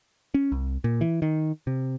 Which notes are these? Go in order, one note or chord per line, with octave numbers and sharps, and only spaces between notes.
C#4
C2
A#2
E3
D#3
C3